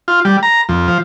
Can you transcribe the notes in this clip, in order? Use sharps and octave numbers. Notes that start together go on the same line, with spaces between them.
F4
G3
A#5
F2
F3